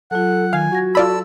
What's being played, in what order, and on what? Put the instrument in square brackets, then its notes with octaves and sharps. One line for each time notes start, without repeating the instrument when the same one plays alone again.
[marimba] F#3 F4 [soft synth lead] A4 [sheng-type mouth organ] F#5
[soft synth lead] D#3 [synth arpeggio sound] F5 [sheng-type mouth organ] G#5
[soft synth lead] F#4 [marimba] F#5 G#6 A#6
[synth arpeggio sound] F4 D5 B5 [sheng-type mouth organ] A4 E6